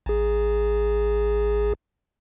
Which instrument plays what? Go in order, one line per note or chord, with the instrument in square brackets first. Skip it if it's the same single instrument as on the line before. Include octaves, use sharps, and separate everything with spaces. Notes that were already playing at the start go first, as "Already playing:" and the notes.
[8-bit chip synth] A1 G#4